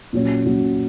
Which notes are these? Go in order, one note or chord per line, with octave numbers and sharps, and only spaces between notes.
A#2 F#3 C#4
A#2 F#3 C#4